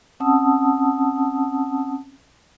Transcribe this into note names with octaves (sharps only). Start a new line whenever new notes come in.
C4 C#4 F#5 A5 D#6 E6